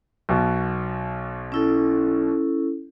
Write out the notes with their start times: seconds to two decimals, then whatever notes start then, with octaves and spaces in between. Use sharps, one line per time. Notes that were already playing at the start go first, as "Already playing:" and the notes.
0.29 B1 B2
1.52 C#4 E4 A4